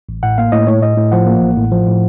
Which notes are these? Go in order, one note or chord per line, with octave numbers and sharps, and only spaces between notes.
A1
A2 F#5
A#3 F5
A2 D#5
A2 C#5
A2 D#5
A2
F3 F#5
A#3
A1
A2
F3
A2